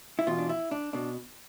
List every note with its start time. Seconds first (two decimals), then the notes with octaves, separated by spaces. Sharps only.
0.19 E4
0.27 E2 B2 F4
0.38 D4
0.49 E4
0.71 D4
0.93 B2 D4